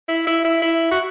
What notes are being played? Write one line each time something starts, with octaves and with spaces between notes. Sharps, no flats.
E4
E4
E4
E4
F#4